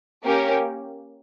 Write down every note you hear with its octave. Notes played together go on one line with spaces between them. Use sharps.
A#3 C#4 G4 A#4